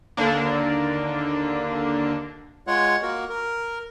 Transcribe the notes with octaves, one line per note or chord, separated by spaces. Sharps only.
D#2 D3 A#3 D4
G#3 F4 C#5 F#5
A#3 F#4 A#4
A#4